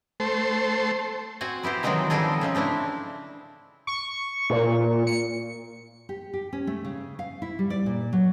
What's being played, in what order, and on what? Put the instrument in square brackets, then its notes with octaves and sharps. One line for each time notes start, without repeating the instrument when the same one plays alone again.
[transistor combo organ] A3 C5
[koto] C4 F#4 F#5 G#5
B3 E4 G4 C5
D#3 E3 F#3 G#3 C4 D#4
F3 G3 C4 D#4 G#4 A4
C#3 C4 D#4
A3 C4 D4 E4
[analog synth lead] C#6
A#2
C#7
[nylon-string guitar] G4
G4
C#4
A3
C#3
F5
E4
G3
D5
A#2
F#3